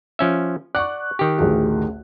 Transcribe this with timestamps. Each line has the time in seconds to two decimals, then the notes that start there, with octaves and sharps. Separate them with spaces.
0.19 F3 C#4 E5
0.75 D5 F#5 C#6 F#6
1.19 D#3 G4
1.38 A1 D2 G#4